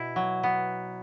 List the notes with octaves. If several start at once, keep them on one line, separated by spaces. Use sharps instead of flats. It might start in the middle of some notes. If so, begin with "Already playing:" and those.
Already playing: B2 E4
F#3
B3